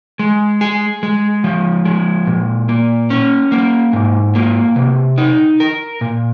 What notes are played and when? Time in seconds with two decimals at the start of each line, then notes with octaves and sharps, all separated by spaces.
0.19 G#3
0.61 G#4
1.03 G#3
1.44 F3
1.85 G#3
2.27 A#2
2.69 A#3
3.10 C#4
3.52 A#3
3.93 G#2
4.35 A#3
4.76 C3
5.18 D#4
5.60 A#4
6.01 A#2